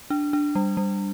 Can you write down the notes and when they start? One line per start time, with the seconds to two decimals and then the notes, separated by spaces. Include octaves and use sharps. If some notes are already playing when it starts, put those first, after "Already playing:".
0.10 D4
0.33 D4
0.55 G3
0.77 G3